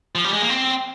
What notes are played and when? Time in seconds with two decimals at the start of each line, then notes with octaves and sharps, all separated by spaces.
0.15 F3
0.24 G3
0.33 G#3
0.42 A#3
0.50 C4